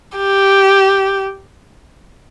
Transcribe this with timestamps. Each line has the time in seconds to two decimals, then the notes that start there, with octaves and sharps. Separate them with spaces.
0.17 G4